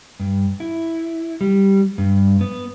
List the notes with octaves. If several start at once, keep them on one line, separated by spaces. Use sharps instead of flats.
G2
E4
G3
G2
B3